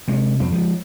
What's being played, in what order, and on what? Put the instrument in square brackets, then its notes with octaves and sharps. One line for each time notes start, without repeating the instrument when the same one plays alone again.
[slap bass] C3 G#3
F2 C4
F3 G#3